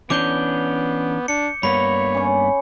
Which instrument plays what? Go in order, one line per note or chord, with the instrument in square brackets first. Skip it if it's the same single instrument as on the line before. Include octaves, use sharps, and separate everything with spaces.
[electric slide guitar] E3 C#4 D4 [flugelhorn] B3 [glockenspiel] D6 G6 G7
[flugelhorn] D4 [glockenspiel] C#7
[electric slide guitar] G2 A#3 B3 [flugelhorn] C#5 [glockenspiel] B5
[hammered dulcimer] C#4 D6